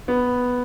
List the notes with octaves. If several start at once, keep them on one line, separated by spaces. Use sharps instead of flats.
B3